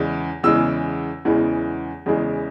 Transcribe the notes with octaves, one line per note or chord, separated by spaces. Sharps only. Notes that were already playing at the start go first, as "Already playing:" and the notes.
Already playing: E2 C#3 E3 G#3
E2 C#3 E3 G#3 E6
E2 C#3 E3 G#3
E2 C#3 E3 G#3